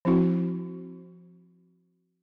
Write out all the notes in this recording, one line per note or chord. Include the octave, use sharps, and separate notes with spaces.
F3 C4 E4 F#4